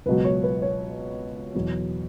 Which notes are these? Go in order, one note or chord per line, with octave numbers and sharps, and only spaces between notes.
C#2 B2 F#3 B4
C#5
B4
C#5
E2 B2 F#3